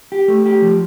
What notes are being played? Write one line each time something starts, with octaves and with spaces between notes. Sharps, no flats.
G4
A3
G4
F3